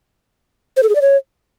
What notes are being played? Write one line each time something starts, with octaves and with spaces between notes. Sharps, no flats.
C5
A4
G#4
D5
C#5